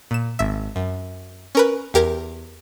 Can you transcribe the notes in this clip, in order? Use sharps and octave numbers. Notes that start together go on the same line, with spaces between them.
A#2 E7
G#1 E5
F#2
C#4 A#4 B4
E2 G4 A#4 G#6 A#6